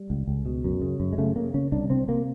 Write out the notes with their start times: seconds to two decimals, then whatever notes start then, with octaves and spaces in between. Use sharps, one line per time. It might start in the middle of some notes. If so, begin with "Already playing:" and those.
Already playing: G3
0.10 C#2
0.27 C#2
0.46 B2
0.64 F#2
0.82 C#3
1.00 F#2
1.13 G#3
1.18 C#3 A3
1.36 C#3 A#3
1.54 C#3 C#4
1.72 C2 D4
1.90 C3 C4
2.08 C3 A#3